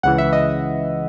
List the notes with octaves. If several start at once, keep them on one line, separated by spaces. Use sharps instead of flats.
C#2 C#3 E3 F#5
E5
D#5